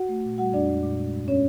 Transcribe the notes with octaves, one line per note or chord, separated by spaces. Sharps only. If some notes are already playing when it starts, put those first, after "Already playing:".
Already playing: F#4 F#5
A3
A#2
G3 F#4 F#5
F2 D4 D5
G#3
A#2
G#3
G2
B3 C#4 C#5